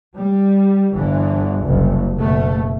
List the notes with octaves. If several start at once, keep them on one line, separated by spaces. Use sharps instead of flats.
G3
G1 D3 E3
F#1 C2
F#1 B2 A3